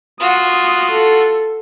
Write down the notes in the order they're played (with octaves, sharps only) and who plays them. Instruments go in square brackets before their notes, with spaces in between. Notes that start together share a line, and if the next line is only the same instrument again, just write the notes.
[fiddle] F4 F#4 [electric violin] D#6
[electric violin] A4